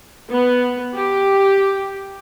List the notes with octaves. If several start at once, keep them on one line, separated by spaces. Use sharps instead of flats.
B3
G4